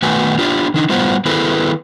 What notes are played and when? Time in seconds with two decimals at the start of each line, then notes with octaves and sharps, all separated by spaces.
0.02 D#3 A3 B3 F#4 B4 G#5
0.38 D4 F4 G4 D5
0.74 D#3 D4 D#4
0.89 A2 G3 B3 F4 C5 F#5
1.25 D#3 B3 E4 G#4 A4 B4